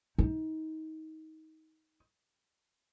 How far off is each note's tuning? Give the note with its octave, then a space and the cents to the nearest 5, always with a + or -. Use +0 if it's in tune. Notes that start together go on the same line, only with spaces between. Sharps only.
D#4 +25